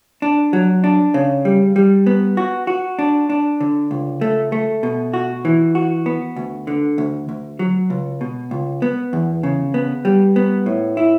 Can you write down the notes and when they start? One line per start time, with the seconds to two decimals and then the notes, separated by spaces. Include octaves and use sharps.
0.22 D4
0.53 F#3
0.84 D4
1.14 C#3
1.45 G3
1.76 G3
2.06 B3
2.37 F#4
2.67 F#4
2.99 D4
3.30 D4
3.61 D3
3.91 C#2
4.21 A3
4.52 A3
4.83 B2
5.14 F#4
5.45 E3
5.75 F#4
6.06 B3
6.36 D2
6.67 D3
6.98 D2
7.29 D2
7.59 F#3
7.90 C#2
8.21 B2
8.51 C#2
8.82 B3
9.13 E2
9.43 C#3
9.74 B3
10.05 G3
10.36 B3
10.66 A2
10.97 E4